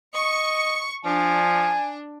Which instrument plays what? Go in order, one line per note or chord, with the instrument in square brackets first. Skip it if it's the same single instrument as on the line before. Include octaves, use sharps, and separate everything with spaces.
[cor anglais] D#5 [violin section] C#6 C#7
[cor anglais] F3 [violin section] D4 [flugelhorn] G#5